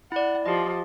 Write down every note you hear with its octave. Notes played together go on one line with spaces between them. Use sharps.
E4 D5 F#5
F3 G4 D#5